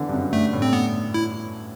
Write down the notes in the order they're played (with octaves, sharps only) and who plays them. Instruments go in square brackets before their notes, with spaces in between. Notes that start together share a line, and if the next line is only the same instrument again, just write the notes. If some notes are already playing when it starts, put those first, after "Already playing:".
Already playing: [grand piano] D3 E3 B3
G2
F#2
[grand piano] G2 [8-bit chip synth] A3
[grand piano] A2
[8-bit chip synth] C4
B3
E4